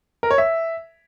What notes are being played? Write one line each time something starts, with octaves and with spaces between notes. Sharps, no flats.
A#4
C#5
E5